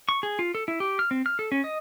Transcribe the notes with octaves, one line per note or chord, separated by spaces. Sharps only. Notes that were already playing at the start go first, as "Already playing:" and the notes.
C#6
G#4
F4
A4
E4
G4
F6
C4
F6
A4
C#4
D#5